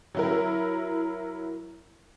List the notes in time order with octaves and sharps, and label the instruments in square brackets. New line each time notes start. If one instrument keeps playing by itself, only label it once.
[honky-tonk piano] F#3 E4 A#4